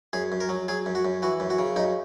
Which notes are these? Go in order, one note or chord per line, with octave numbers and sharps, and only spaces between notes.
F#2 G#4
F#2
A#4
F#3
F#3 G#4
F#2
F#4
F#2
E3 F#4
F#2
F#4
C#3
F#2 D#4